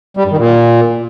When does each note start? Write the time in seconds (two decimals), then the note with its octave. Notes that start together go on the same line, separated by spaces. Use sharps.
0.17 G3
0.24 G2
0.31 D#3
0.38 A#2